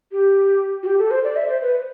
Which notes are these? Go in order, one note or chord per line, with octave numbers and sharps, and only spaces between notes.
G4
F#4
G4
A4
C5
D5
E5
C5
B4